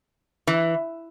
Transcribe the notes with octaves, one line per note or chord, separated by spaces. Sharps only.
E3